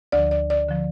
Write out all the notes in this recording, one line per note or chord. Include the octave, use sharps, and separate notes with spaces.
D2 D3 F3 D5
D5
D5
D3 F3